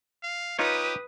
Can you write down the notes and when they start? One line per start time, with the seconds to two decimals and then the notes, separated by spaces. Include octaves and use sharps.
0.23 F5
0.59 D#4 F4 G4 B4 C#5 D#6